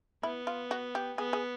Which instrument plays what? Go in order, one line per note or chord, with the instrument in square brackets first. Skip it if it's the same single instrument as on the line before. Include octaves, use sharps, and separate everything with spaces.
[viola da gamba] B3 [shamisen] E4
[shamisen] F4
F#4
G4
[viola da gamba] B3 [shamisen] G#4
[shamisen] G#4